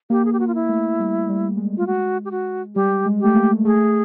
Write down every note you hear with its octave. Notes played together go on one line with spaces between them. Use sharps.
A#3 G4
G#4
G4
A#3 F#4
F4
E4
A3
G3
G3
G#3
F4
F#4
G4
F#4
G3 G4
G#3
A3 G4
A#3
A3 G#4